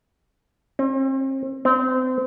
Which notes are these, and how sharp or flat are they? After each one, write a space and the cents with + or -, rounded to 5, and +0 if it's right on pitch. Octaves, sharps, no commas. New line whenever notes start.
C4 +40
C4 -30